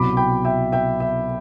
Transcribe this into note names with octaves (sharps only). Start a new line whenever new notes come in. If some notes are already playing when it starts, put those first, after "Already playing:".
Already playing: C2 B2 F#3 B5 D6
G5 B5
E5 G5
E5 G5
E5